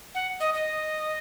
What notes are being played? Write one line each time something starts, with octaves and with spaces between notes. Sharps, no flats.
F#5
D#5
D#5